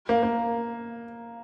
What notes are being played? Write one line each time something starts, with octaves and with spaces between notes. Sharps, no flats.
A#3
A#3